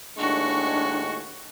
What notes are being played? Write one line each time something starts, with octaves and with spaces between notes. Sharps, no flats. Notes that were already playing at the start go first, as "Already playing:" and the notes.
D#2 A2 G#3 D4 F#4 C#6